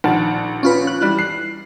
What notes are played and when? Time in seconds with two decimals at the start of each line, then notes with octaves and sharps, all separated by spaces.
0.04 A#1 D#3 F#5 A5
0.63 C#4 F4 B4
0.87 F#6
1.01 E3 G3
1.19 C7